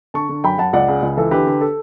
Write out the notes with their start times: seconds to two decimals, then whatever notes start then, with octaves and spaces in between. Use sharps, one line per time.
0.14 D3 A5 C#6
0.29 D3
0.44 F#2 G5 B5
0.58 F#2 F#5 A5
0.73 C#2 D5 F#5
0.88 C#3
1.02 C#2
1.17 E3 A4
1.31 D3 G4 B4
1.47 D3
1.61 A4